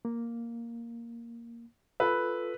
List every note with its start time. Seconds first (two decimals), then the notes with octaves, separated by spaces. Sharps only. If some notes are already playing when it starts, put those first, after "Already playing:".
0.05 A#3
2.00 F4 A4 B4 E6